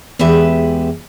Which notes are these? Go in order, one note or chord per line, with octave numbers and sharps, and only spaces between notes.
E2 G#3 G4 B4 E5